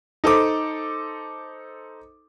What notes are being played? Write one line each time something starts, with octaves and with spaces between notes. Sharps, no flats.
D#4 A4 C5 D6